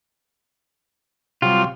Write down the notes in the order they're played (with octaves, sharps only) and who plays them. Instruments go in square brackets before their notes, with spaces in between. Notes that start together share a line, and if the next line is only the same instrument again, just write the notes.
[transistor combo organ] C3 F#3 G3 [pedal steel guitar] F4